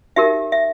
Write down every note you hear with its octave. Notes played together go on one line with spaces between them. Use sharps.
D#4 G4 A#4 E5
E5